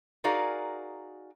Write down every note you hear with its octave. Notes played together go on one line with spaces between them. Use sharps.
D#4 F#4 G#4 A#4 D5 F5